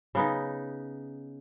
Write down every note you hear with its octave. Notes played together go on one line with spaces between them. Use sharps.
C#3 B3 D#4